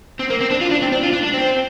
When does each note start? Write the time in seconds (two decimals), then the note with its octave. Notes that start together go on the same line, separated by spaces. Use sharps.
0.19 C4
0.30 A#3
0.41 C4
0.51 D4
0.61 F4
0.71 D4
0.82 C4
0.92 D4
1.03 F4
1.13 D4
1.23 D4
1.34 C4